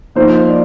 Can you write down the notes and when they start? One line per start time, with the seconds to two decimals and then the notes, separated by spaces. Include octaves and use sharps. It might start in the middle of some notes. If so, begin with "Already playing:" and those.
0.15 F3 A#3 D#4 C5
0.48 D5